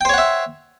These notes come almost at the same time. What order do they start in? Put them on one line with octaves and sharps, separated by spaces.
G5 C5 C#5 F#5 E5